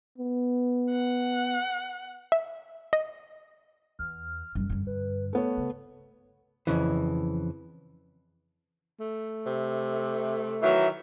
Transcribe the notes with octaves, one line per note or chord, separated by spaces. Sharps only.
B3
F#5
E5
D#5
E2 F6
F#2 D3 G3
G2 D3
B4
A3 B3 B4 C#5
C#3
F2 C#3 E3
A3
C3
D#3 E3 F#3 E5